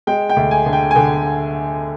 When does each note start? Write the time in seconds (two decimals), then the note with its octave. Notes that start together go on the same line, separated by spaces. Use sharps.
0.07 G#3 G5
0.30 G5
0.36 D2
0.51 G#5
0.66 D3
0.73 G5
0.91 G#5
0.95 D3 G5